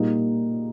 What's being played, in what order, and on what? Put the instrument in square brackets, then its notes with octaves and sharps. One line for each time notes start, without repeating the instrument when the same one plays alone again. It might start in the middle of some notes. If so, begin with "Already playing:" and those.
Already playing: [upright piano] A#2 G3 A#3 D#4